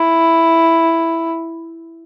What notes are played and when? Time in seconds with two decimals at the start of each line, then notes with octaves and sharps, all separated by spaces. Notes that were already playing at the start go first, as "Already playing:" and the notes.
Already playing: E4